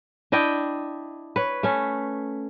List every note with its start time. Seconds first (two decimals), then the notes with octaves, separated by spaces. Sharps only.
0.32 D4 E4 D#5 G5
1.36 B4 C#5
1.63 A3 C#4